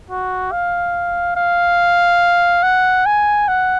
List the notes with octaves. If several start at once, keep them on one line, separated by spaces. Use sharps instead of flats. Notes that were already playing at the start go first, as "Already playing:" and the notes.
F#4
F5
F5
F#5
G#5
F#5